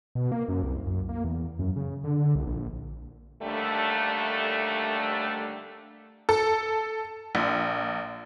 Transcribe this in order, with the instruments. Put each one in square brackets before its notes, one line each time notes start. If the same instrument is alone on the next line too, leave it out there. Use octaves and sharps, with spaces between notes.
[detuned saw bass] B2
A#3
F#2
C2
F#2
A#3
E2
F#2
C#3
D3
C2
A#1
[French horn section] D#2 D3 G3 A3
[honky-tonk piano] A4
A#1